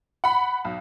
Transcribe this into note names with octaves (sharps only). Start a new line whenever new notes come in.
F#5 B5
B1